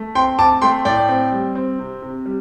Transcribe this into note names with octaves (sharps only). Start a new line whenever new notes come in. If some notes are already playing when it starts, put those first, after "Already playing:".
Already playing: A3
C4 G5 C6
C4 A5 D6
A3 G5 C6
A2 D5 G5
C4
G3
C4
C3
C3
G3